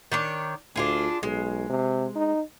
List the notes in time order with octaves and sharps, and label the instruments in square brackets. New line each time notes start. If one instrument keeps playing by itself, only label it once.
[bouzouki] D#3 D4 C#5
[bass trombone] D2 [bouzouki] D4 F4 G#4
[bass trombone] B1 [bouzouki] G#3
[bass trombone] C3
D#4